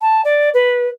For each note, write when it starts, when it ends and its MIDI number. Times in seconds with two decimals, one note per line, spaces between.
0.01 0.21 81
0.25 0.50 74
0.54 0.89 71